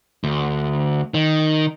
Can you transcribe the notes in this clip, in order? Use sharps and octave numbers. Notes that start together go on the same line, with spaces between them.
D2
D#3